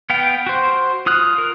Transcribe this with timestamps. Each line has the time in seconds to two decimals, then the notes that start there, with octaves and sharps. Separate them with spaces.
0.10 B3 F5 G5
0.47 F#4 C5
1.06 F4 D#6 F6 F#6
1.38 A#4